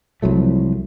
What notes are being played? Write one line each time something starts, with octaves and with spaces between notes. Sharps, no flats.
C2 F3 F#3 A3